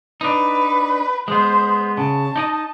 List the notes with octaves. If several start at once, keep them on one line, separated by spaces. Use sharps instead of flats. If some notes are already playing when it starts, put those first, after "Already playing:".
D4 D#4 B4
G#3 B3 C5
C#3 A5
D#4 D5 D#5